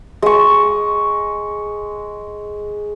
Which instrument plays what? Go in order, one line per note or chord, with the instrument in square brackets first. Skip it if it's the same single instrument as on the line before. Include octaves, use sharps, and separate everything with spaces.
[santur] G#3 C#6